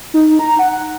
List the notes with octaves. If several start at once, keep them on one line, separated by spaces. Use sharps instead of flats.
D#4
A#5
F#5